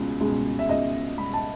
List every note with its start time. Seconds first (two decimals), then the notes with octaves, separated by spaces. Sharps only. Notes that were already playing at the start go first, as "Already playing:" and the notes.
Already playing: C#2 B2 G#3
0.20 C#2 B2 G#3
0.59 E5
0.69 C#2 B2 G#3 D#5
1.17 C#2 B2 G#3 B5
1.34 A5